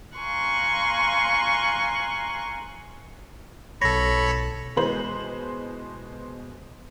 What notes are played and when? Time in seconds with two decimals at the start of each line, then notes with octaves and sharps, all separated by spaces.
0.17 F5 G#5 A#5 C6 C#6 F#6
3.82 B1 A4 C#5 B5 A#6
4.76 B2 E3 G#3 B4 C5 F#7